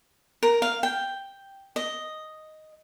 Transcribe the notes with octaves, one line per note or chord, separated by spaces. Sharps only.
A#4
F5
G5
D#5